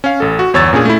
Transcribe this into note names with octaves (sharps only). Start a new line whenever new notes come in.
C#4 F5
A1 A4
F#4
G1 E2 C#5 E6 A6
A#2 C#4 D4 G#4
A3 E4